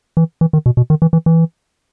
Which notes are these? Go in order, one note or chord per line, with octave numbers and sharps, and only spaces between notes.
E3
E3
D#3
B2
B2
D#3
E3
E3
E3